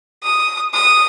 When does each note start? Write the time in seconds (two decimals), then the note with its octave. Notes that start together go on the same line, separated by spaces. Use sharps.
0.23 D#6
0.74 D#6